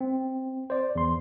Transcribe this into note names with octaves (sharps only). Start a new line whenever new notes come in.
C4
C5 D5
E2 C6